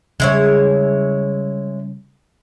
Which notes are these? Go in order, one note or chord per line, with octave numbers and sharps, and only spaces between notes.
C#3 G3 G#3 E4 C#5